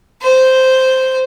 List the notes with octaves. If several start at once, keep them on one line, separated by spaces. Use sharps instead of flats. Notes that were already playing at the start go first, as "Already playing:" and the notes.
C5